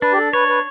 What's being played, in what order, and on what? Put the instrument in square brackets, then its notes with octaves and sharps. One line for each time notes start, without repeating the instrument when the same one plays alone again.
[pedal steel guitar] D4 [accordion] B4
[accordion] G4
A4
[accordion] B4 [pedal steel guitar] C#5
[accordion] B4